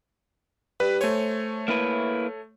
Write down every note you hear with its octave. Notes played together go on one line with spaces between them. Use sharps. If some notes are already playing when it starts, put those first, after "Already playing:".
G2 B4
A3 C5 C#5 G#5
A#3 E4 B4